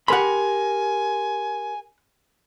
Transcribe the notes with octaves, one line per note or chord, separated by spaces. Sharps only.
G4 A#4 F#5 G#5 B5 C6